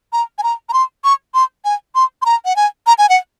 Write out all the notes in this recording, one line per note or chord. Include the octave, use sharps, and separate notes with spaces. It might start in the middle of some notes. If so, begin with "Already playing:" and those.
A#5
G#5
A#5
A#5
C6
C#6
C6
G#5
C6
C6
A#5
F#5
G#5
A#5
G#5
F#5